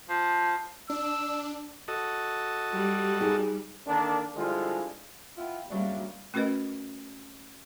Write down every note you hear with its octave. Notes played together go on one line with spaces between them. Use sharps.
F3
D4 E6
F#4 A4 D#5
G3
D#4 G#4
D3 D#3 A#3 D4
D3 F3 G3 G#3 E4 F4
B3 E4 F4 F5 G5 B5
C#3 F#3 G3 A#3 D4 E5 F5
A3 C#4 F#4 A#4 B4 D#5